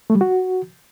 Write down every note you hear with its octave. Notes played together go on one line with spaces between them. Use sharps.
A3
G3
F#4